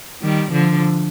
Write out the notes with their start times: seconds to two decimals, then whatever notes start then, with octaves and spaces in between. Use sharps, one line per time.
0.22 D#3 G3
0.52 D3 F3